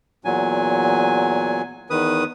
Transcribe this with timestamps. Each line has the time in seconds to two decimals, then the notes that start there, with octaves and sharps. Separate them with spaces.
0.25 E2 A#2 F#3 G#5
1.90 E2 D#3 B4 D#6